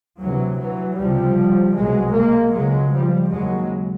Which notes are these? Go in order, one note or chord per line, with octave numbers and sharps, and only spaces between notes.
D2 C3 E3 F#3
E3 F#3
C#2 C3 F3 G3
C2 B2 F#3 G#3
G#3 A#3
C#2 C#3 F#3 G#3
F3 G3
D#2 C#3 F#3 G#3